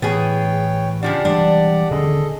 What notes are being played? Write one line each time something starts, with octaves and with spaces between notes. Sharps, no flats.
A2 E3 B3 G#4 C#5 G5
C#3 F3 D4 G4 D5 F#5
E3 G3 G#3 D4
D#1 D3 C#4 G#4 A4 D#5